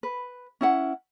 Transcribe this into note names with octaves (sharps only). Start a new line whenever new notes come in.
B4
C#4 E4 F#5